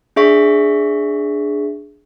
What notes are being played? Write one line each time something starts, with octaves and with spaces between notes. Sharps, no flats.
D4 G#4 E5 C#6 B6